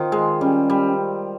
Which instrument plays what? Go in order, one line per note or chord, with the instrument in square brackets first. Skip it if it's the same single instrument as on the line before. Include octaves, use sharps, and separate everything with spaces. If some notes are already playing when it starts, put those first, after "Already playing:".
Already playing: [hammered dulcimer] D#3 C4 F4
G#3
[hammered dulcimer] G3 [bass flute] C#4
[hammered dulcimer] G3